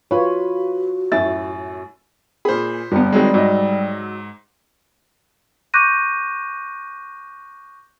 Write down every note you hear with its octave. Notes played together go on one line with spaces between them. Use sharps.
F4 F#4 B4 C#5
F#2 A2 A3 E4 E5 A6
A#2 G#4 C5 B5
G1 G3 B3
D#3 F#3 G#3 C4 G#4
G#2 F#3 D#5
C#6 D6 F#6 G6 A#6 D#7